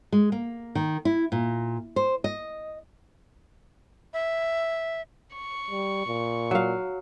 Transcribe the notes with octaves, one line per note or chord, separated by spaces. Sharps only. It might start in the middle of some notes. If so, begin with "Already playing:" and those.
G#3
A#3
D#3
E4
A#2
C5
D#5
E5
C#6
G3
A#2
F#3 F5